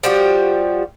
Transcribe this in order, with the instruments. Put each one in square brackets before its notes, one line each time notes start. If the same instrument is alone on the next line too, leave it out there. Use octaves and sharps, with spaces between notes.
[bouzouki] F3 G3 F#4 G4